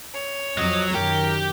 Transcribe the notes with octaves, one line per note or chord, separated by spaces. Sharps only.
C#5
F2 F#3 D#5
F#2 D#3 G4 A#4